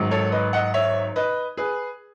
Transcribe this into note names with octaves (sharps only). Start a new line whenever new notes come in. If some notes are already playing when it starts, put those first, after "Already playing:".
Already playing: G#1 G#2 D#3 F#3
A4 C#5
B4 D#5
D#5 F#5
C#5 E5
B4 D#5
G#4 B4